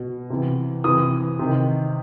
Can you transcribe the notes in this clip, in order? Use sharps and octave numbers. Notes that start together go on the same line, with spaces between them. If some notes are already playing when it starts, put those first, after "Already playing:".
Already playing: B2
C3 E3
C3 E3 D#6
C3 D#3